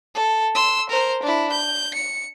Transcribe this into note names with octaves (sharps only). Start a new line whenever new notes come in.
A4
C6 E6
A#4 C5
D4 E4
G6
C#7